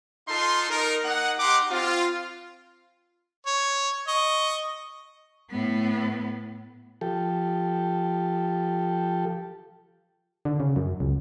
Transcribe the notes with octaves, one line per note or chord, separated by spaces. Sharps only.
D#4 F4 A4 C6
D#4 A#4
A#3 D#4 F#5
D#4 G4 F#5 C6 D6
C4 F4
C#5
D#5 C#6
A2 B3
F3 G4 A4
D3
C#3
F#2
C#2